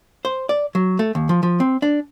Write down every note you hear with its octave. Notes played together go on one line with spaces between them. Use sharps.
C5
D5
F#3
A3
D#2
F3
F3
C4
D4